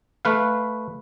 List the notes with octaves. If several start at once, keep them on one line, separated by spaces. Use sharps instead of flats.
A3 B4 F5